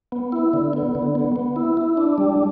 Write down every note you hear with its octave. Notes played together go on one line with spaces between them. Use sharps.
B3
E4
D3
B3
D3
B3
B3
E4
E4
D4
G3